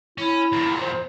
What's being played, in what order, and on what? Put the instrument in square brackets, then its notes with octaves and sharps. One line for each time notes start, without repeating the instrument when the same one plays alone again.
[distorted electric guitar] C#4 [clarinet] E4
[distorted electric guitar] E2 A#2
[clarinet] C5